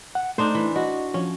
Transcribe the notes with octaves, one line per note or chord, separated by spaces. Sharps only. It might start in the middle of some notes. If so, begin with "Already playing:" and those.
F#5
A3 D4 D#4 C5
E3
F#4 D#5
F3 C#4